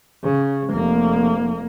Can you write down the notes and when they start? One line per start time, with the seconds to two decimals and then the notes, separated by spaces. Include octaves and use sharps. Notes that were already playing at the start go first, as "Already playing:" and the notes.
0.24 C#3
0.71 F1 A#3